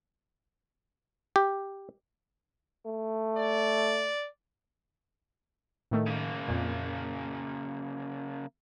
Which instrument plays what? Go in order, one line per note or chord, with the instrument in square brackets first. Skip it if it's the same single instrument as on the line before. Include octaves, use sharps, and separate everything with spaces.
[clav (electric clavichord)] G4
[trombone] A3
[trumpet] D5
[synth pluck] A2 D#3 A3
[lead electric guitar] C#3 A#3
[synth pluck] F2 A#2